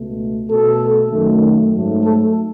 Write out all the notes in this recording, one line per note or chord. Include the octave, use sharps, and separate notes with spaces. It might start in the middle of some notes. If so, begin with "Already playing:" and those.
Already playing: C#2 B2 A3
B2 A3 A4
F#2 D#3 A3
G#2 F#3 A3
A4